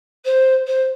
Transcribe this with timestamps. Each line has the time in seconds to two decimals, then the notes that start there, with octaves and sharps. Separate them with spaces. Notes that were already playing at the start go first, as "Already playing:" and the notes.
0.25 C5
0.66 C5